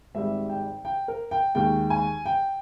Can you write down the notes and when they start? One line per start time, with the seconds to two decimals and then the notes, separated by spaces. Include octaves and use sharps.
0.14 G#1 G#2 G3 E5
0.49 G5
0.85 G5
1.08 A#4
1.31 G5
1.55 D#2 D#3 G#3 G5
1.90 G#5
2.26 G5